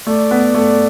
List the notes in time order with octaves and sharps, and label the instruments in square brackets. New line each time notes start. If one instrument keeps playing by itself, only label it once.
[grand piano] A3 [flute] D5
[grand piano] B3
A3